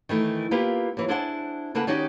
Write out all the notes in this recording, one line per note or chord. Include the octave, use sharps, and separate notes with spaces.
D#3 E3 A3
A#3 B3 E4 F4 G4 B4
D#2 E3
D4 E4 G#4 C5 F#5 A5
C#3 A#3 A4 B4 F#5 A5
D#3 C#4 D#4 F#4 G4 D5